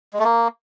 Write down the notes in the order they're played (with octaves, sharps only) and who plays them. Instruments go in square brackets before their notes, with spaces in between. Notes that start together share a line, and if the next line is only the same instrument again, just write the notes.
[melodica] G#3
A3
A#3